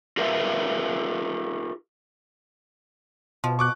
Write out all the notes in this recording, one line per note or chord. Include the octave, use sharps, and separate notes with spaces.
F4 G4 A#4 B4 E5 F5
B2 F3
C#6 D6 F#6